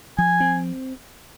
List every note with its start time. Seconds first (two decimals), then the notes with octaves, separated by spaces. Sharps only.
0.18 F3 G#5
0.40 C4